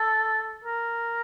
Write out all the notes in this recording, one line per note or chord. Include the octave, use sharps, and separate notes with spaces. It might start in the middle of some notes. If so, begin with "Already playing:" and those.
Already playing: A4
A#4